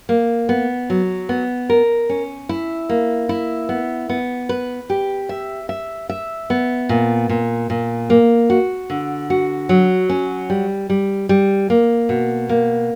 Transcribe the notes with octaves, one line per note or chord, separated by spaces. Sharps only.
A#3
B3
F#3
B3
A#4
C#4
E4
A#3
E4
B3
B3
B4
G4
E5
E5
E5
B3
A#2
A#2
A#2
A#3
F#4
D3
F#4
F#3
C#4
G3
G3
G3
A#3
B2
A#3